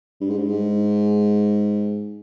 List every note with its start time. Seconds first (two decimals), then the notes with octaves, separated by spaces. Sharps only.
0.21 G2
0.30 G#2
0.38 G2
0.49 G#2